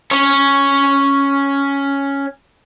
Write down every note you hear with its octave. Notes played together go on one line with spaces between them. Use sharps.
C#4 C#5